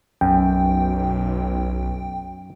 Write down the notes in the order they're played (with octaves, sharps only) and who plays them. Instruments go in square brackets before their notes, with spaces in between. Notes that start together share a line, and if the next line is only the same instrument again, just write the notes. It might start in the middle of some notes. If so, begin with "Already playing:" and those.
[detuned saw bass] B1 [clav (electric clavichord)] F#2 [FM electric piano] G5